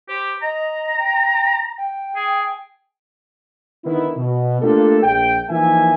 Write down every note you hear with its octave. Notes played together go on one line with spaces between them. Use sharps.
G4 C5
D#5 A#5
G5
G5
G#4
D3 D#3 B3 D#4 E4
B2
A3 A#3 D4 F4 G4 A4
A#1 G5
E3 F3 A#3 D#4 E5 G#5